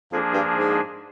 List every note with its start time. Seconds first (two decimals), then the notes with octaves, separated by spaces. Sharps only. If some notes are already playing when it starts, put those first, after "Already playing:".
0.12 F2 F3 A#3 D4 G#4
0.33 G2
0.55 G#2